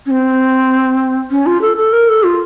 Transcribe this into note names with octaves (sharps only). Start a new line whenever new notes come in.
C#4
C4
C#4
F4
A4
A4
A#4
A4
F4